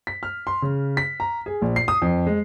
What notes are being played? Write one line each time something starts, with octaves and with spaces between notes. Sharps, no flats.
B6
F6
C6
C#3
B6
A#5
G#4
A#1
C7
D#6
F2
G#3